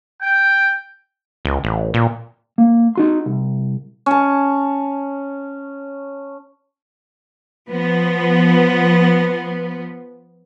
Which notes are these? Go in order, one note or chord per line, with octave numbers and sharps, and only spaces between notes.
G5
C#2
A1
A#2
A#3
D#4 F#4 C6
C2
C#4 A5
F3 B3